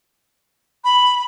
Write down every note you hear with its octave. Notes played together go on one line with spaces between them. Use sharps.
B5